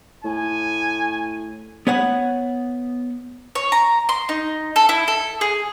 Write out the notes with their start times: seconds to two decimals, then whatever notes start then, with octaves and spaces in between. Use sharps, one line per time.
0.24 A2 G#5
1.87 B3 C#5 F#5
3.55 C#5
3.72 A#5
4.09 C6
4.29 D#4
4.76 A4
4.89 E4
5.08 A4
5.41 G#4